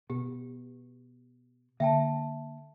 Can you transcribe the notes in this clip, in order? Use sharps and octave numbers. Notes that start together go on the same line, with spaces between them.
B2 G4
D3 A#3 E5 G5 A5